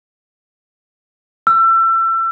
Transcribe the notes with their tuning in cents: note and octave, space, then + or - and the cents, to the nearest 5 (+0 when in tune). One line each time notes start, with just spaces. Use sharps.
E6 +30